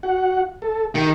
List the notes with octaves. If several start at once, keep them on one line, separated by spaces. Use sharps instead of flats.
F#4 F#5
A4
D#3 G4